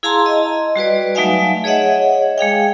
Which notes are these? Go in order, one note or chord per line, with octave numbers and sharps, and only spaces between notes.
E4 G#4 F5 A5 A#5 C6
D#5
G3 F#4 B4 D5
F#3 A3 D#4 E5 F5 G#5
G#4 C#5 D#5 E5 F#5
G#3 G#4 F5 G5